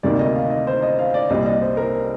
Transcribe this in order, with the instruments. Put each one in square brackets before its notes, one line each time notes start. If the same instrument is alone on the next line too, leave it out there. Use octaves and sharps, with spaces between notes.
[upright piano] D2 C3 D#3 A#3 D#4 D5
D#5
F5
D#5
C5
D#5
F5
D5
C2 A#2 G3 D#5
D#5
C5
A#4